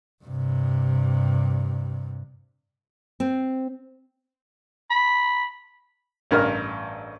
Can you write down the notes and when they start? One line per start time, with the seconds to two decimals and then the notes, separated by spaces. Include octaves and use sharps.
0.23 G2 C3
3.20 C4
4.90 B5
6.31 A1 G2 A#4 F6